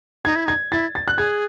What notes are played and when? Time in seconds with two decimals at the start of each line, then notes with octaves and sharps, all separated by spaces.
0.25 D#4 G#6
0.36 E4
0.46 D#4 G#6
0.72 E4 A6
0.95 A6
1.08 F#6
1.17 G#4 G#6